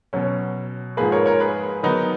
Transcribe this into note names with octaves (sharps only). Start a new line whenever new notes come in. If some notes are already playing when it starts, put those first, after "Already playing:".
B2 F#3 C#4
G#2 F3 A#3 G#4 B4
A#4 C#5
A#4 C#5
G#4 B4
D#3 F#3 B3 D#4